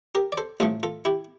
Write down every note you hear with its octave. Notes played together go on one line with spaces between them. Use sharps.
G4 A#4
D5
A4 C5
A1 A2 F3 A3 F4 A4
F4 A4
E4 G4